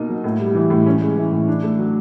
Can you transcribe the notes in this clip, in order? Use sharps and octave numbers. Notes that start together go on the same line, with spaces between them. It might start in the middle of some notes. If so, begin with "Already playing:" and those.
Already playing: B2 A#3 D#4
F#3
A2
G3
E3
A2
C#4
G#3
E3
A2
D4
A3
F#3